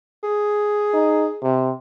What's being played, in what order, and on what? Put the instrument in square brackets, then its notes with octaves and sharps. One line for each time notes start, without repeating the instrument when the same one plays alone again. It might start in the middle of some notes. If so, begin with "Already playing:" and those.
[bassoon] G#4
[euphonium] D#4
C3